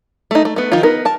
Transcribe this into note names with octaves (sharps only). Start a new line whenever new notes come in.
A3 D#4
A3
A3 B3
D#3 F3 D#4 F4
B3 D#4 A#4
A#4 A5